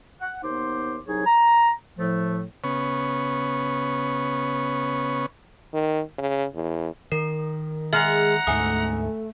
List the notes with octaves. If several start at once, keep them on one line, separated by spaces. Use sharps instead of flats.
F#5
D#2 B3 D#4 C5 C6 D6
C2 F#3 D#4 G#4 C#5 G#5
A#5
A2 F3 A3
C#3 B3 C#6
D#3
C#3
E2
D#3 A#4
G#3 G#4 E5 F#5 A#5 F6
D2 G#2 A3 G#5 D#6